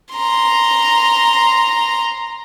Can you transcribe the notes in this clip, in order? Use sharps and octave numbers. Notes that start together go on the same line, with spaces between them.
A#5 C6